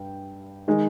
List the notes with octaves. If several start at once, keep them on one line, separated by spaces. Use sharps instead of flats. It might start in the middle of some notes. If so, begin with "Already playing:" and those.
Already playing: G2 G5
D#3 G#3